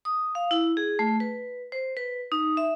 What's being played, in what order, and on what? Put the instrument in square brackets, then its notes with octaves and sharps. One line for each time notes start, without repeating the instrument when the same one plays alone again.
[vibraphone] D#6
F5
E4
G#4
A3
B4
C5
B4
D#4
E5